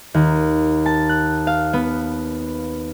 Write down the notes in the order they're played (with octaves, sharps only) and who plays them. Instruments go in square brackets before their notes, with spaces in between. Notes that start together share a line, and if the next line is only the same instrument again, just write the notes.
[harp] D#2
A5
F#6
F5
B3